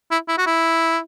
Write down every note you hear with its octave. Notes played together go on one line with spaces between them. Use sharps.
E4
E4
F#4
E4